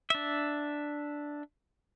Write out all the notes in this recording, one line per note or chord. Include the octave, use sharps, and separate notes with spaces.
D4 E5